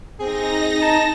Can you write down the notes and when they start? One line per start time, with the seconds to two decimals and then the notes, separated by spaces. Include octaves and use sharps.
0.20 C4 D#4 G#4 A#6
0.82 A5 A#5